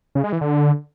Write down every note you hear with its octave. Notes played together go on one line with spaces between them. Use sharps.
C#3
G#3
E3
D3